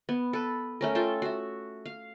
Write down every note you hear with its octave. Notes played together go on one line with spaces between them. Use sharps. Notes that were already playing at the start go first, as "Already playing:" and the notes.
B3
A4 B4
A3 C#4 A#4
F4 A4 E5 G5
F#4 E5
F5